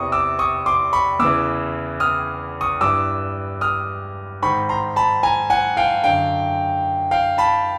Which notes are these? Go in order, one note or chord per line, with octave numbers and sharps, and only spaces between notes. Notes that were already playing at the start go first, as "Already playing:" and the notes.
Already playing: E2 C3 E3 C#6 D#6
D6 E6
C#6 D#6
C6 D6
B5 C#6
E2 C#3 E3 D6 E6
D#6 F6
C#6 D#6
G2 E3 D6 E6
D#6 F6
G#2 D#3 B5 C#6
A#5 C6
A5 B5
G#5 A#5
F#5 G#5
F5 G5
F#2 D3 F5 G5
F5 G5
A5 B5